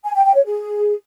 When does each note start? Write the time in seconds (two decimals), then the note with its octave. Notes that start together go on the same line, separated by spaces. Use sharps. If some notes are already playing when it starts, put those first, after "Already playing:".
0.04 G#5
0.14 G5
0.24 G5
0.35 C#5
0.45 G#4